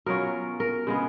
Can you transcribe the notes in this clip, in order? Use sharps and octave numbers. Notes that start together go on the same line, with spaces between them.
B2 F#3 C#4 F4 A#4
A#4
C#3 G#3 B3